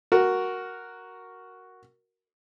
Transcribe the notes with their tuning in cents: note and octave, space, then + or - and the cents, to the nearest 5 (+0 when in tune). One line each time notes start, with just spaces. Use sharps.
F#4 +0 A#4 +0